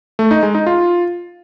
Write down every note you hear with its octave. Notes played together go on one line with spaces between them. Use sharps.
A3
D#4
G#3
D#4
F4